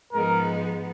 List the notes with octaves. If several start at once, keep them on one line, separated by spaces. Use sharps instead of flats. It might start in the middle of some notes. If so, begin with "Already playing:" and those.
G#2 F3 G#3 B3 D#4 A#4